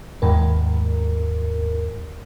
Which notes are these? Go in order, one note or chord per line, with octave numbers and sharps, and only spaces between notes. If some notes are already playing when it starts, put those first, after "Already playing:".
D#2 G#2 A#4